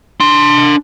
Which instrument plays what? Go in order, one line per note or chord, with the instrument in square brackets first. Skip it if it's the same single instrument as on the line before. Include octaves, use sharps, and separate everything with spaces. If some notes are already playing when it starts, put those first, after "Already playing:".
[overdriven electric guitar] D4 C6